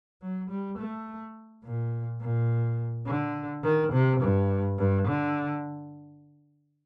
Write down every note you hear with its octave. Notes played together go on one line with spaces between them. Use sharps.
F#3
G3
A3
A#2
A#2
D3
D#3
C3
G2
G2
D3